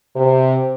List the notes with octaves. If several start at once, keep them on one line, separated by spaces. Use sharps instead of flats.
C3